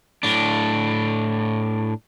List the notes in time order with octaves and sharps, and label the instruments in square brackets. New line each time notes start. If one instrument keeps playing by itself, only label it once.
[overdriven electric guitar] A2 D4